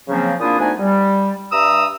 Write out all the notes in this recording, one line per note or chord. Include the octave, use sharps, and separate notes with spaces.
C#3 F3 F#3 A#3 C4 C#4
A#2 A#3 D4 E4 F4 D#6
D2 A3 B3 D4 D#4 G#5
G3
G2 E5 A#5 D#6 E6